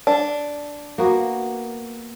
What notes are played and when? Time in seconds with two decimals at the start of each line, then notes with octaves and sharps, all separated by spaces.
0.07 D4
0.98 A#3 B3 F#4